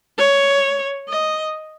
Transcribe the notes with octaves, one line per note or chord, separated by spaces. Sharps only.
C#5
D#5